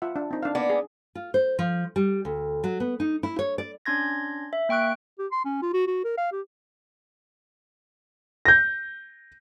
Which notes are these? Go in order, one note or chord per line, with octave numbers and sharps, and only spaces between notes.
F4 E5 F#5
D4
C4 D#4
D4 F5
A#3 B3 D5
G#4
F4
C5
F3
G3
D2
F#3
B3
D#4
E4
C#5
D5
C#4 D4 C6 G#6 A#6
E5
A#3 G5 C#6 F#6 D7
G4
C6
C#4
F4
F#4
F#4
A#4
F5
G4
G6 A#6